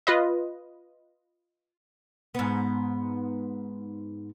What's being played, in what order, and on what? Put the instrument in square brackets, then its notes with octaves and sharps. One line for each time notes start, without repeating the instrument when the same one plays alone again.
[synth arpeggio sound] F4 B4 D#5
[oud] G#2 B3